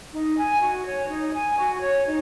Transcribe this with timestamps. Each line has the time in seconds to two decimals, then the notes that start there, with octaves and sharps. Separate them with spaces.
0.13 D#4
0.37 G#5
0.60 F#4
0.85 C#5
1.09 D#4
1.33 G#5
1.58 F#4
1.81 C#5
2.06 D#4